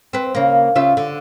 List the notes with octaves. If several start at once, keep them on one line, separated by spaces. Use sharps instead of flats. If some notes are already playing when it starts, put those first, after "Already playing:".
C4 B4
C#3 A#3
C#3 F4 E5
D3